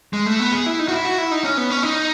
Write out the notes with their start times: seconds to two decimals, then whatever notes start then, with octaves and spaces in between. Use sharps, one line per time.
0.13 G#3
0.26 A3
0.40 B3
0.52 G#4
0.66 E4
0.79 D#4
0.88 F#4
0.91 E4
1.05 F#4
1.18 E4
1.31 D#4
1.44 C#4
1.57 B3
1.70 C#4
1.83 D#4